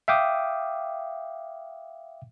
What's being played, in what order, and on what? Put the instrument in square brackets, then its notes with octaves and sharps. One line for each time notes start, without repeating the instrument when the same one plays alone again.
[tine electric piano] E5 F5 G5 D6 D#6